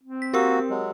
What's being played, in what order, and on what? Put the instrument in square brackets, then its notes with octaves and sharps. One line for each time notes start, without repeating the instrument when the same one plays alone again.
[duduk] C4
[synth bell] B6
[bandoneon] A#3 F#4 [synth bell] G4 A#4 E6
[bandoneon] F#3 G#3